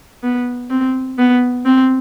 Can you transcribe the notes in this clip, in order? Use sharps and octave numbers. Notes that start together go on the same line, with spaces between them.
B3
C4
B3
C4